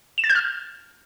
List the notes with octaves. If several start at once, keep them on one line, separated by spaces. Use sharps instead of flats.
E7
A6
G6
F6